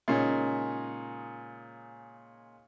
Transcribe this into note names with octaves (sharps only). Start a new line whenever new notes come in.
A#2 C#3 G#3 C#4 D#4